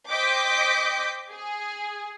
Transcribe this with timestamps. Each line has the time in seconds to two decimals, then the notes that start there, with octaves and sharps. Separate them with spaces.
0.11 C5 D#5 G5 D6 G6 B6
1.29 G#4